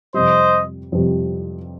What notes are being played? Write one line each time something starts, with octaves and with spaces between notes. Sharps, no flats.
F2 C3 G3 C5 D#5
F2 C3 G3